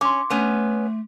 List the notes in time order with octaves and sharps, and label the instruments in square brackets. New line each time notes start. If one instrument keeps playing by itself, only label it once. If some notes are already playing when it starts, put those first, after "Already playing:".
[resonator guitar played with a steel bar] C#4 [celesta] C6 D6
[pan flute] A3 [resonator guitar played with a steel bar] B3 C#4